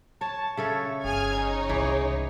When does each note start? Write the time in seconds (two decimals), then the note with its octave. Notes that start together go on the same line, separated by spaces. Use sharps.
0.21 C#5 A5
0.57 C#3 A4 C#5 E5
1.04 G1 G#4 G#5 F6 G#6
1.36 D#4 C#5
1.69 C2 G#2 E3 G#4